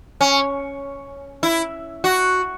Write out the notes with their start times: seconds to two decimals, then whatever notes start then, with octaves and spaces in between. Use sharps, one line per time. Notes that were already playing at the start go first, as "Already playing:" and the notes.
0.21 C#4
1.43 E4
2.04 F#4